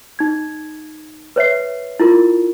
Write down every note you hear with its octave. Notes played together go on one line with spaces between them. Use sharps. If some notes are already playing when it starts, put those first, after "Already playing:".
D#4 G#6
B4 C#5 E5 C7
E4 F4 A#4